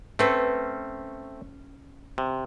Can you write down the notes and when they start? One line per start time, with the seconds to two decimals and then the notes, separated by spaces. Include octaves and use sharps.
0.19 A3 C4 C#4 B4
2.18 C3